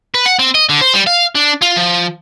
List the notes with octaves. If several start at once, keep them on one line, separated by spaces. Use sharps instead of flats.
B4
F#5
C4
D#5
D3
C5
G3
F5
D4
F4
F3